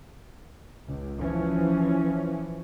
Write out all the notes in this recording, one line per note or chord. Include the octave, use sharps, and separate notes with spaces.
C#2
E3 F3 C#4